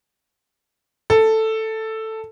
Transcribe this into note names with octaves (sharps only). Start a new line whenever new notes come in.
A4